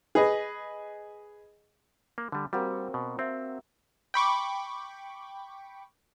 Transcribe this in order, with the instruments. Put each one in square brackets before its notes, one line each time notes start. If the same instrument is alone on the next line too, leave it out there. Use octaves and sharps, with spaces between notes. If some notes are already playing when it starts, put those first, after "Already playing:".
[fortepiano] G#4 B4 D#5
[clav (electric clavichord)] A#3
D3 G3
[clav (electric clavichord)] G3 [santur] A#3 C4 F#4
[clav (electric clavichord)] B2
[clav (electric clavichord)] C4 [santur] E5
[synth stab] G5 B5 C#6 D6